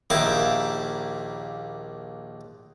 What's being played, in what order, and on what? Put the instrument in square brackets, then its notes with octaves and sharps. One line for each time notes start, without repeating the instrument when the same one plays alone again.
[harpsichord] A#1 D#2 A#3 E4 E5 D6